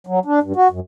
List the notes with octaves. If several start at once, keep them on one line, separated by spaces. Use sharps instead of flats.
F#3
D4
G2
F#4
F#2